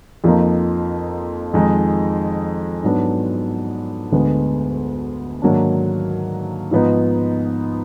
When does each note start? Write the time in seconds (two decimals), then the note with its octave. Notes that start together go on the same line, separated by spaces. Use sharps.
0.24 F2 F3 A#3 D#4
1.53 F2 D#3 G#3 D#4
2.84 G#2 F#3 B3 D4
4.12 D2 D3 G#3 B3
5.42 G#2 D#3 F#3 A#3 D4
6.71 G#2 F3 B3 D#4